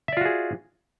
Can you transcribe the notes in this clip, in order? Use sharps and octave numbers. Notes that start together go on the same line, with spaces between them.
F4 F#4 G#4 D5 E5